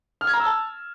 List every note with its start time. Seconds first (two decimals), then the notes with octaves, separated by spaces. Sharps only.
0.21 F6
0.27 G#6
0.34 A#5
0.40 E6
0.46 A5